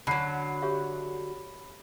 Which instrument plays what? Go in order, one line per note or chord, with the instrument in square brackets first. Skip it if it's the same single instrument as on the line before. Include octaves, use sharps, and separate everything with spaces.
[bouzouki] D3 F#3 [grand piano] B5 C7
[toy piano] G4 C#5 E5